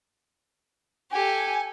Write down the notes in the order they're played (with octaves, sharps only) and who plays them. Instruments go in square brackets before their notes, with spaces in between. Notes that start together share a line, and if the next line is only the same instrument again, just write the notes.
[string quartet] G4 A4 [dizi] G#5